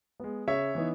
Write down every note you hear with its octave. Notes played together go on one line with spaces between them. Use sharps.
G#3 B3
C#3 C#5 E5
E3 B3 D#4